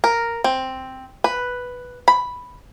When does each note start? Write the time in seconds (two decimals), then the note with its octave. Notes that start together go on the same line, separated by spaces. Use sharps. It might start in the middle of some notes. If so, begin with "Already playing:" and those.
0.04 A#4
0.44 C4
1.24 B4
2.08 B5